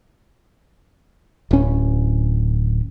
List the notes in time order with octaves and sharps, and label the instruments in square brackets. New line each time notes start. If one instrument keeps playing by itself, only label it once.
[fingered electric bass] D1 C#4